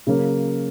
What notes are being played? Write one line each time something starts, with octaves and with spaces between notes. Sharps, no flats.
C#3 F#3 A#3